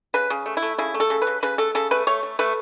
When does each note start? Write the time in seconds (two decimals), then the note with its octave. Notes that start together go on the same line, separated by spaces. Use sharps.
0.14 C#3 B4
0.30 C#3
0.46 A3
0.57 E4
0.62 A3
0.78 C#3 E4
0.94 A3
1.00 A4
1.10 C#3
1.22 B4
1.27 C#3
1.43 C#3 B4
1.58 A3 A4
1.75 C#3 A4
1.91 A3 B4
2.07 A3 C#5
2.23 A3
2.39 A3 B4